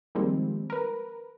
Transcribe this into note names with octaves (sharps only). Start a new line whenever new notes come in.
D#3 F3 G3 G#3 A#3 C4
A#4 B4